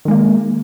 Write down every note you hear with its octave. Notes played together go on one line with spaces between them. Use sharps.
D#3 G#3 A#3